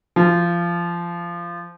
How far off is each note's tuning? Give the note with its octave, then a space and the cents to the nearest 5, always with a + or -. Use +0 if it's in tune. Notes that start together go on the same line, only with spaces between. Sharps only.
F3 -20